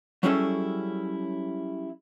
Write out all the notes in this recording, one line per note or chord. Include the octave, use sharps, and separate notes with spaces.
F#3 G3 C#4 E4 G#4 A4